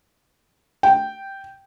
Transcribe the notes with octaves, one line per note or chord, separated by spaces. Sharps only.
G5